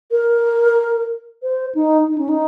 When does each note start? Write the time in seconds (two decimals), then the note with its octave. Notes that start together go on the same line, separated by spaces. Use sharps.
0.12 A#4
1.43 C5
1.75 D#4
2.08 D#4
2.18 C#4
2.29 D#4